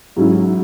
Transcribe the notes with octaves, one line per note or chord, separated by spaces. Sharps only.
G#2 F#3 C#4 E4